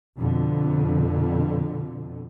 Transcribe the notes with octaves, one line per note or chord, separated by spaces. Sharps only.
F2 B2 D3